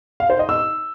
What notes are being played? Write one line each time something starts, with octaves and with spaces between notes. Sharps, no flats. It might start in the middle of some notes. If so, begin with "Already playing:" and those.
F5
C5
D#5
E6